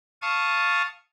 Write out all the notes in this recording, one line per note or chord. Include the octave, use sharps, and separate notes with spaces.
F5 A5 C#6 D#6